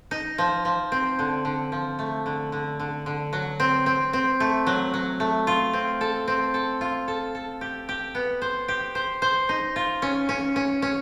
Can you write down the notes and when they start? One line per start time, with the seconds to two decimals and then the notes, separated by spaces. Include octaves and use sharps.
0.11 D#4
0.38 F3
0.65 F3
0.92 C4
1.19 D3
1.45 D3
1.72 F3
1.99 A3
2.26 D3
2.52 D3
2.80 D3
3.06 D3
3.33 F#3
3.60 C4
3.86 C4
4.13 C4
4.40 A3
4.67 F#3
4.94 F#3
5.20 A3
5.47 F4
5.73 C4
6.01 A4
6.28 C4
6.54 A4
6.81 F4
7.08 A4
7.35 A4
7.61 G4
7.89 G4
8.15 B3
8.42 C5
8.68 G4
8.95 C5
9.22 C5
9.49 D#4
9.76 F4
10.02 C#4
10.29 C#4
10.56 C#4
10.82 C#4